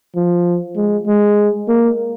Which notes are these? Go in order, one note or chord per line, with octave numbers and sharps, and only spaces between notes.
F3
G#3
G#3
A#3